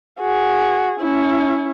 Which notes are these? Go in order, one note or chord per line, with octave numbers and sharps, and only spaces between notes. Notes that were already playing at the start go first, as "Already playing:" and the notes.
F#4 G#4
C#4 E4